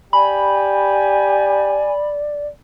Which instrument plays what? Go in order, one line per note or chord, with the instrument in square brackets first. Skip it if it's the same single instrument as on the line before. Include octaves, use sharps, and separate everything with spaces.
[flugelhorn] G4 [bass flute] D5 [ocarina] G#5 [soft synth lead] B5